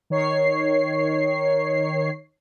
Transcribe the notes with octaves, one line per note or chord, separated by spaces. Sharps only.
D#3 C#5 C7